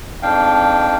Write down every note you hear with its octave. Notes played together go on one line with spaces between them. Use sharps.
F2 G#2 D4 F5 G5